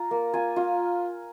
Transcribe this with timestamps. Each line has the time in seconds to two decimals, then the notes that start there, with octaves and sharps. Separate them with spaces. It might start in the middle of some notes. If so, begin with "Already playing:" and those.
Already playing: F4 A#5 C6
0.11 A#3
0.33 F4 G#5
0.56 F4